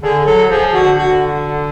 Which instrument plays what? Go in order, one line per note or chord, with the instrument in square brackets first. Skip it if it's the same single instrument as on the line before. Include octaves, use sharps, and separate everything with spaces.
[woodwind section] D3 [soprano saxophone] G#4
[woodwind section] F#3 [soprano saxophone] A4
[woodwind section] F3 [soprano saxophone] G#4
[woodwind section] D3 [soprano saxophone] F#4
[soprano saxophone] F#4